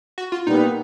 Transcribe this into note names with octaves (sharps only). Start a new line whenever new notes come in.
F#4
F4
A#2 G3 B3 D#4